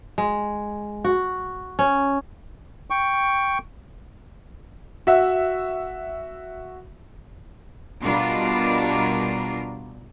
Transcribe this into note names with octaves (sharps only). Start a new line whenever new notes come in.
G#3
F#4
C#4
G5 C#6
F#4 E5
B2 G3 D4 F4 A#4